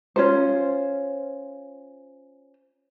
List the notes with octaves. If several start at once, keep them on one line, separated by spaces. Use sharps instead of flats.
C#4 F4 C5